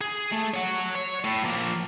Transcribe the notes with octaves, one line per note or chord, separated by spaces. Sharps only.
G#4
A3
C#5 F#5
C#5
A2
F3 A#3